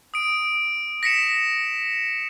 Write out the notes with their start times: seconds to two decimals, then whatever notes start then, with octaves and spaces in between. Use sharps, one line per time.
0.14 D#6 D7
1.03 A#6 B6 C#7 E7